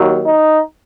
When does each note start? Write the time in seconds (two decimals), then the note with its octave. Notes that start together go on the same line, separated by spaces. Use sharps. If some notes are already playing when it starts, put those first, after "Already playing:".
Already playing: D#2 D#3 F#3
0.25 D#4